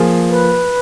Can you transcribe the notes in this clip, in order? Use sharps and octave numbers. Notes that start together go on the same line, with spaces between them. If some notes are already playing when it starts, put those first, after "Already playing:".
Already playing: F3 A#3 F4 G#4
B4